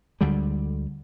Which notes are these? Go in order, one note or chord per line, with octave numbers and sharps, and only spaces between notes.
D2 D3 G3 G#3